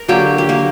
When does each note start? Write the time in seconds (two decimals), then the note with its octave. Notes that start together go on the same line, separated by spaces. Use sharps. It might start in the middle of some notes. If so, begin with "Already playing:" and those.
Already playing: A#4 A#5
0.08 D3 F#3 A#3 G4 G5
0.38 G4
0.49 A#3 A#4